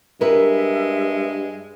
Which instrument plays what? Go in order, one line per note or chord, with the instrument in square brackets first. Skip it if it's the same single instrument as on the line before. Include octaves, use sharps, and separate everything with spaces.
[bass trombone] G2 [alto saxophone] G#3 [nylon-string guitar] A#4 B4 [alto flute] E5